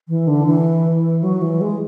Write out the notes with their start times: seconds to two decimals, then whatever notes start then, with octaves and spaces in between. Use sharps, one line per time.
0.09 E3
0.27 D3
0.46 E3
1.23 F#3
1.42 E3
1.61 G#3